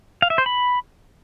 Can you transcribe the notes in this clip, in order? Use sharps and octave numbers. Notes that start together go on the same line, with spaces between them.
F5
E5
C5
B5